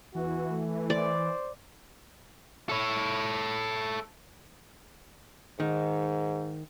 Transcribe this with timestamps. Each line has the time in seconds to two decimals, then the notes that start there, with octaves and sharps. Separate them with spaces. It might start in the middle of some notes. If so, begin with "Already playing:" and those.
0.15 E2 E3 F#4
0.50 A3
0.90 C5 D5
2.69 A4 C#5
5.60 G#2 D#3